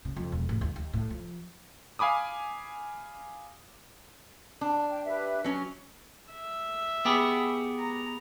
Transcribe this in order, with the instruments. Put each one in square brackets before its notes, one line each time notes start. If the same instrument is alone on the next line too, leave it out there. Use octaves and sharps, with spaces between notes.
[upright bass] C#3
F2
E1
A1
D#2
D#2
A2
F3
[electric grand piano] F5 G#5 B5 D6 D#6
[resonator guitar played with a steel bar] D4
[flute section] G5
G4 B4 E5
[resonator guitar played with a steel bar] F#3 C#4
[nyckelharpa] E5
[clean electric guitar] B3 G4 G#4
[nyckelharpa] A#5